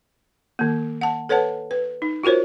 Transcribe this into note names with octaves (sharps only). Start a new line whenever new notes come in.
D#3 A#3
F#5 A5
A4 B4 C#5 F#5 A5
B4
D#4
F4 F#4 A#4 C5 C#5